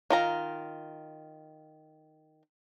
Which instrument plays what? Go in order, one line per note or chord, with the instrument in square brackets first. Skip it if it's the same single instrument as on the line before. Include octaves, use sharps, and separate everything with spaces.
[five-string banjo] D#3 F4 A#5